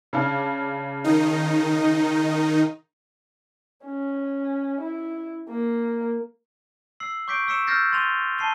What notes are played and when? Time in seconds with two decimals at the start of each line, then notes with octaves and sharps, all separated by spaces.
0.13 C#3 D4 F5
1.04 D#3 D#4
3.85 C#4
4.81 E4
5.49 A#3
7.00 E6 C7 F#7
7.28 C#6 D6 G6 B6 C7 D7
7.47 C#6 E6 B6 C#7 E7
7.67 E6 F6 G6 A6 A#6 C7
7.92 C6 A6 D#7 F7 G7
8.38 A5 C7 D#7 G7